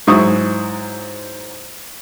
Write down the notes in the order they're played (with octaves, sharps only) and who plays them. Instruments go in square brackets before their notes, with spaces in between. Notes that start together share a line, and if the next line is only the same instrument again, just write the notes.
[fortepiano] G#2 F#3 E4 C#6 D#6